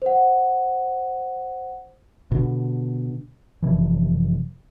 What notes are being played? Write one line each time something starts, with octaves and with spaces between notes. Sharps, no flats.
C5 F#5
B2 D3
F#1 C3 E3 F3